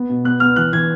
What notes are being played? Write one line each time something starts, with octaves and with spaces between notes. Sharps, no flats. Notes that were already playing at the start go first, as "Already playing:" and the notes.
Already playing: B3
B2
B3 F#6
B3 F6
E3 F#6
E3 G#6